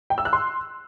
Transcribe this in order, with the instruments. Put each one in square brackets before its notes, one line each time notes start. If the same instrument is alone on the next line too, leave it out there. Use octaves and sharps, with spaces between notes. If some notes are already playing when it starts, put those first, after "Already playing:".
[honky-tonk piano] G5
E6
F#6
C6